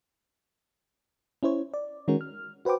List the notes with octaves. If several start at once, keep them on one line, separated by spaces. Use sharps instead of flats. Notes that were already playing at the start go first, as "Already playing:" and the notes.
C#4 E4 C5 C#5
D5
D#3 G#3 C#4 F#4 A#4
F6
F#4 B4 C5 G5 D6